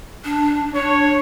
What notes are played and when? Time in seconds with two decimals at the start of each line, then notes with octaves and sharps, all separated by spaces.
0.25 D4
0.75 D4 C#5